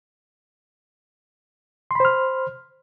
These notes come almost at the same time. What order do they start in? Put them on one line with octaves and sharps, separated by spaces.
C6 B5 C5 F6